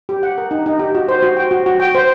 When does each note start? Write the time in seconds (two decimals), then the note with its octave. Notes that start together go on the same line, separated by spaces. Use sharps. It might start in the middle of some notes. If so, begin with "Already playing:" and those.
0.09 G4
0.23 F#5
0.38 A#4
0.51 D#4
0.66 D#4
0.79 G4
0.95 F#4
1.09 C5
1.23 F#4
1.37 G5
1.51 F#4
1.66 F#4
1.80 G5
1.95 C5